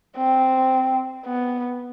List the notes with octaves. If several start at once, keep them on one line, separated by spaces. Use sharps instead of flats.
C4
B3